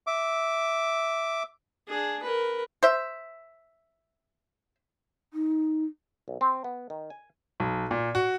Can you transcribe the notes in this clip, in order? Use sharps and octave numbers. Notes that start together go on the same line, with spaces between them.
E5 D6
D4 G#4
A#4 B4
C5 E5
D#4
B1
C4
B3
D#3
G#5
B1
A#2
F#4